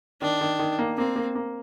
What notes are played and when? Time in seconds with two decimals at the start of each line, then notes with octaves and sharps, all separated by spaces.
0.21 D#3 D4
0.41 D#3
0.59 D#3
0.79 A#3
0.98 A#3 C4
1.16 A#3
1.35 A#3